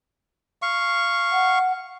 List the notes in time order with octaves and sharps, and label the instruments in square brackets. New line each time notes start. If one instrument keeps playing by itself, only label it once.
[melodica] F5 C#6
[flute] F#5